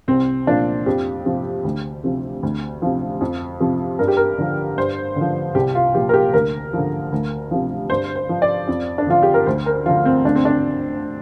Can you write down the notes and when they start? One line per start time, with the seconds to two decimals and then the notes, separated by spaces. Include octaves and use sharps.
0.08 C2 C4
0.47 A#2 F3 D4
0.86 F2 G4
1.25 C3 F3
1.64 D2
2.04 C3 F3
2.43 D2
2.82 C3 F3
3.21 F2
3.60 C3 F3
3.99 G2 A#4
4.08 G4
4.17 A#4
4.38 D3 F3
4.78 G2 C5
5.16 D3 F3
5.55 C2 G4
5.75 F4
5.95 A#2 F3 G4
6.09 A#4
6.14 G4
6.33 D2 A#4
6.73 D3 F3
7.12 D2
7.51 C3 F3
7.90 G2 C5
8.16 C5
8.29 F3
8.42 D5
8.68 F2
8.98 D4
9.07 D3 F3 F4
9.23 G4
9.34 A#4
9.46 D2 C5
9.66 A#4
9.86 D3 F3 F4
10.05 C4
10.24 D2 D4
10.35 C4
10.45 D4